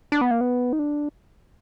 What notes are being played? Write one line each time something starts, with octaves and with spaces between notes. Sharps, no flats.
D4
B3
A#3
B3
D#4
D4